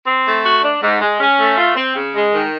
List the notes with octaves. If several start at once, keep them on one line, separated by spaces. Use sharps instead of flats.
C4
A3
F#4
D4
G#2
G#3
C#4
A3
F4
C4
C#3
G#3
D#3